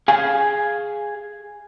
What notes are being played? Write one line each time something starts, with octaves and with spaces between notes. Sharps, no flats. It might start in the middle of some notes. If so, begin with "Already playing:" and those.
G#4 F5 G#5